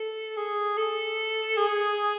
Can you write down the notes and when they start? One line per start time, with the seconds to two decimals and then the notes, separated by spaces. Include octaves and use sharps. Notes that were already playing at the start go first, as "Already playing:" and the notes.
Already playing: A4
0.37 G#4
0.77 A4
1.57 G#4